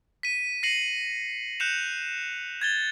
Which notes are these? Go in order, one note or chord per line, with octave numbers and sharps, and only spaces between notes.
B6 D#7
A#6 C7 C#7 D#7 F#7
F#6 G6 C#7 E7 F7
G#6 A6 G7